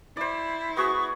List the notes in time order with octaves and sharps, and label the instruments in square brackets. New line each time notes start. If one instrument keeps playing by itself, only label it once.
[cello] E4 [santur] C5 D5
[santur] B3 F#4 G#4 [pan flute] C#6